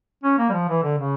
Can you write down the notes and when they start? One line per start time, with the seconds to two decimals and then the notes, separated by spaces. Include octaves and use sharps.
0.24 C#4
0.38 A#3
0.49 G3
0.53 F3
0.68 E3
0.83 D3
0.98 C#3